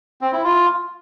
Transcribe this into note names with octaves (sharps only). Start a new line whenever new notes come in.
C4
E4
F4